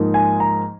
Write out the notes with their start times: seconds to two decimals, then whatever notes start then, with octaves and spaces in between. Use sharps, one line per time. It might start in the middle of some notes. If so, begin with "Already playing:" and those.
Already playing: G#2 F3 A#3 D#4
0.14 G#5
0.40 A#5